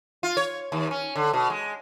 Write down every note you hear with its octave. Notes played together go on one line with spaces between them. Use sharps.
F4
C#5
D#2
C#4
D3
B2
G#3